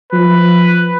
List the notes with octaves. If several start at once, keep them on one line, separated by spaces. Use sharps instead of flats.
F3 B4